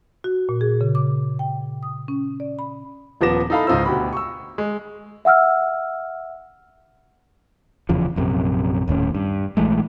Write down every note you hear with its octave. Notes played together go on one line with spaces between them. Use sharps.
F#4
A#2
G#4
C#3
D6
G5
D#6
C#4
D5
B5
D#1 F3 B3 D6 A#6 E7
D#4 E4 A4 F5 A#5 B5
C#2 G#2 D#4 F4 C5 E6
D2 B2 F#4 G4 B5
C#6 E6
G#3
E5 F#5 E6 F6
F1 E2 C#3 F3
A#1 F#2 C3
D#1 D#2 A2 C#4
G2
A#1 E3 G#3 A3